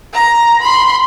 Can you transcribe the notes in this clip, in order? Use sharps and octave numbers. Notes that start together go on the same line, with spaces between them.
A#5
B5 C6